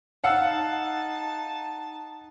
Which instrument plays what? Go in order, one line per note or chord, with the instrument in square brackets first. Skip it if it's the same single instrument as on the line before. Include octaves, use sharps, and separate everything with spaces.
[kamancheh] D#4 A5 [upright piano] F5 F#5 E6